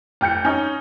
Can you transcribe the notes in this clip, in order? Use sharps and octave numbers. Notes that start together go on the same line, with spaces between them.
F1 G5 G6 C#7
C#4 D#4